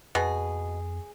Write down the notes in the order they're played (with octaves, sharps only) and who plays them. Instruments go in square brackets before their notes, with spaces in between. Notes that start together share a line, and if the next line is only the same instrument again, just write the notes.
[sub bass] F2 [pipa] B2 [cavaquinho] G#4